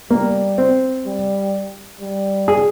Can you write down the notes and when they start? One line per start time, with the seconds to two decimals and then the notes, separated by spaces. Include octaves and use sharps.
0.10 G3 A#3
0.58 C4
1.06 G3
2.01 G3
2.48 G#4